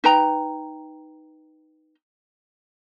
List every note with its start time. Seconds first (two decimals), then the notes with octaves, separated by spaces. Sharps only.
0.04 D#4 B4 G5 A#5